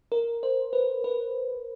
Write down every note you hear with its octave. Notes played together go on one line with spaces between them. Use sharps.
A#4
C5
B4
B4